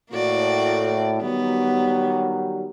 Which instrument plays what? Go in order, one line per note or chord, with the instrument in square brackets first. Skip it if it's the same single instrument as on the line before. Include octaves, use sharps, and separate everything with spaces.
[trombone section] A2 [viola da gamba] A#3 F#4 D5
[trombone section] D#3 F#3 G3 [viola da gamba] B3